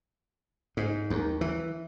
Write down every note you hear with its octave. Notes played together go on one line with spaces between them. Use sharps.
G#2
D#2
E3